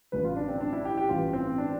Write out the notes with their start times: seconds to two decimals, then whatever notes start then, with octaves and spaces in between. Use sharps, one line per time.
0.12 A1 G2 D3 F3 B4
0.24 F4
0.37 D4
0.48 C4
0.61 D4
0.73 E4
0.85 G4
0.97 G4
1.09 A1 G2 E3 F4
1.33 C4
1.58 D4